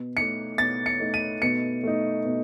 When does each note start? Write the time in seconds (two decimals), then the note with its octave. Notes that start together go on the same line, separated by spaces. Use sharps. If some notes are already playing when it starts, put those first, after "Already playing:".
Already playing: B2
0.17 A3 D#4 C#7
0.58 B2 A6
0.86 C#7
1.00 A3 D#4
1.14 D#7
1.42 B2 C#7
1.83 A3 D#4
2.25 B2